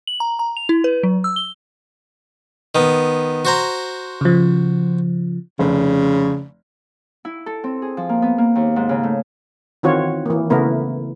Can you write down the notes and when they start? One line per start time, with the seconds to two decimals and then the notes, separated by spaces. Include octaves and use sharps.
0.07 F#7
0.20 A#5
0.39 A#5
0.57 F7
0.69 E4
0.84 B4
1.03 F#3
1.24 E6
1.36 G7
2.75 D#3 B3
3.45 F#4 C5 A#5
4.21 C#3 F3
5.59 F1 C#3
7.25 E4
7.46 A4
7.64 C4
7.82 G#4
7.97 F3
8.09 A#3
8.22 B3
8.38 A#3
8.55 D#2
8.76 G#2
8.89 C#3
9.03 A3
9.83 D#3 E3 C4 F4 F#4 C#5
10.26 E3 A#3
10.50 C#3 A3 B3 E4 A#4